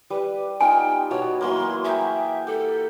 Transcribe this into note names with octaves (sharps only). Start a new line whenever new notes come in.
G3 B4
B3 D#4 F4 G5 G#5
B2 F#4 C#5
E3 F#3 A#3 C6
G#4 E5 G5
G4 A4